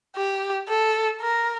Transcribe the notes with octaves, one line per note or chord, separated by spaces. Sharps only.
G4
A4
A#4